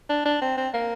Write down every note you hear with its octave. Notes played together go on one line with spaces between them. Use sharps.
D4
D4
C4
C4
A#3